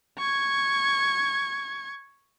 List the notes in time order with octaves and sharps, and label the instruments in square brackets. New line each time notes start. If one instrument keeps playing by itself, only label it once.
[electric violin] C#6 G#6